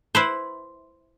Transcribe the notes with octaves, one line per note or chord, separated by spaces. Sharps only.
E4 B4 C5